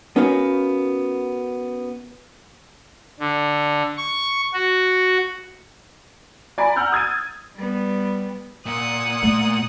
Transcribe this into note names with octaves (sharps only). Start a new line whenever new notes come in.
B3 C#4 D#4 F#4 A#4 F5
D3
C#6
F#4
D5 G#5 A#5 B5 D7
F#5 A#5 E6 F6 G6
D#6 G#6 A6 D#7
G3 B3
A#2 F#5 D#6
A3